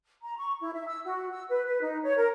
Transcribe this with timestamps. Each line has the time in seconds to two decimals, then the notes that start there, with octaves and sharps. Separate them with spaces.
0.22 A#5
0.38 C#6
0.60 E4
0.73 E5
0.86 E6
1.05 F#4
1.32 E6
1.48 B4
1.66 B4
1.82 D#4
2.03 C#5
2.17 A#4